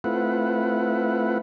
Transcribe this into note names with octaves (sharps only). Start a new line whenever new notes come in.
A3 C4 E4 F4 B4 F#5